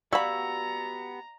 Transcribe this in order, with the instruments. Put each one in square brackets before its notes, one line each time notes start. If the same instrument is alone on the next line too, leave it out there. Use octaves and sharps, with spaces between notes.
[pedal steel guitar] B3 G4 E6 [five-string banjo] F#4 B5 [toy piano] D5 F5 [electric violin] A#5